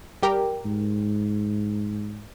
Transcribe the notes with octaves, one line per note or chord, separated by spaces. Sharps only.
G3 G4 A#4
G#2